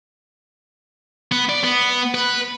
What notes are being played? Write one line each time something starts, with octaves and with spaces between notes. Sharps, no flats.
B3
D5
B3
B4